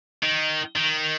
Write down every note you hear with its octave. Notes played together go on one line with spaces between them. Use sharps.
D#3
D#3